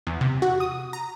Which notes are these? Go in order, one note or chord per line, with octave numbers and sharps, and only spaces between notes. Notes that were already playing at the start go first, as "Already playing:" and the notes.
E2
C3
F#4
D#6
A#5